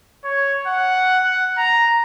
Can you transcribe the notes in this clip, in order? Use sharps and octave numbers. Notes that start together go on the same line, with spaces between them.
C#5
F#5
F#5
A#5